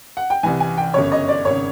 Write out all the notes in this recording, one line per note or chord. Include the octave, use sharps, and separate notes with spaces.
F#5
G5
C2 C3 E3 G#5
G#5
G5
G1 F#2 C#3 C#5
D#5
D5
G#1 C#3 C#5